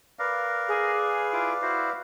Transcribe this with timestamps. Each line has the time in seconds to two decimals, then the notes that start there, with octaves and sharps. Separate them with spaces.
0.19 A#4 B4 D5 F5
0.68 G#4
1.33 E4 F4 D6
1.62 E4 F#4 C5